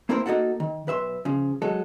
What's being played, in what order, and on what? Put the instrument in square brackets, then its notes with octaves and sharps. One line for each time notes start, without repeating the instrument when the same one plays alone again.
[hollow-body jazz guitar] A#3 C4 E4 A4 A#4 C5
A#3 D#4 F#4 A4 F#5
D#3
B1 B4 E5 C6
C#3 F3
F#3 G#3 A4